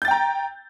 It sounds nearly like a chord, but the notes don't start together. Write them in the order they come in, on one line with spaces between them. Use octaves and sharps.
G6 A6 G5 A#5